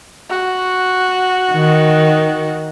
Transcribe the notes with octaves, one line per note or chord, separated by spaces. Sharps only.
F#4
D#3